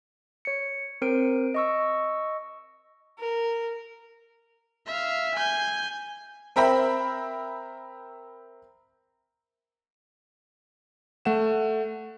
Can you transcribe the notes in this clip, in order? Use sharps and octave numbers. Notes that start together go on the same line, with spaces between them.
C#5 C#7
C4 A#4 C5 D7
D#5 C#6 E6
A#4
E5 F5
G#5 G6
C4 A#4 E5 G5 B5
A3 F#5 E7